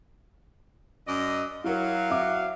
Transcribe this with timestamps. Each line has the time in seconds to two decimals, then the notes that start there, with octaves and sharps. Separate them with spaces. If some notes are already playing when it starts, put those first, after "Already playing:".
1.06 F#2 D5 D#5
1.64 F#3 E4 A#4 F5
2.10 E5 D6